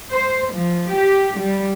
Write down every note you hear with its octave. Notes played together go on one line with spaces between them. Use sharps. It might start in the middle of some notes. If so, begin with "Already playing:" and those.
C5
F3
G4
G3